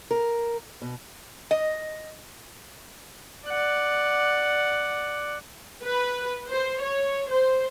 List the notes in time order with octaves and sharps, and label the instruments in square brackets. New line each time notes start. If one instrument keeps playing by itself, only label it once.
[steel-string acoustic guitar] A#4
B2
[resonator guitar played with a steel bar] D#5
[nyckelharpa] D5 F#5
[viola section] B4
C5
C#5
C5